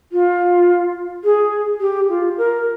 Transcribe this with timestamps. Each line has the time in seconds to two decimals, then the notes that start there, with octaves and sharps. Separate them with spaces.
0.12 F4
1.24 G#4
1.81 G4
2.09 F4
2.38 A#4